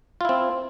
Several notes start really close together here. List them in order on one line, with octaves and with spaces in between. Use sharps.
F4 E4 C4